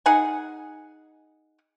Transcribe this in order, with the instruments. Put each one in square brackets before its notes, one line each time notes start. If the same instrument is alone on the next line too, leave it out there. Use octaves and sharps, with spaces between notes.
[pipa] D#4 G#4 F#5 G#5